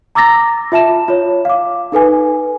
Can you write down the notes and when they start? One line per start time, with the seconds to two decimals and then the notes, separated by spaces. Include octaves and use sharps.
0.15 A#5 D6 E6 A6 A#6
0.72 F4 E5 A5 E7
1.08 F4 C#5
1.45 F5 D6
1.92 D#4 A4 B4 G#5